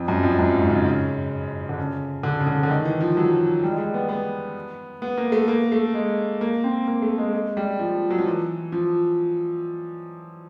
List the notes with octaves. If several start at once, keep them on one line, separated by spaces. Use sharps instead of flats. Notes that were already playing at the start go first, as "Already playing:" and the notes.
Already playing: F2
F#2
F2
F#2
G#2
C#3
C#3
D3
C#3
D3
C#3
D3
D3
D#3
E3
F3
F#3
G3
G#3
G3
B3
B3
B3
A#3
A3
A#3
A3
G#3
A#3
C4
A#3
A3
G#3
G#3
G3
F3
F#3
F3
E3
F3